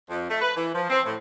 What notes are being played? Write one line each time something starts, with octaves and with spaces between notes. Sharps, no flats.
F2
A3
B4
E3
F3
C4
A2